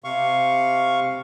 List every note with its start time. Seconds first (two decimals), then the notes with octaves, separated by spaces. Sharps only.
0.04 C3 F5 C#6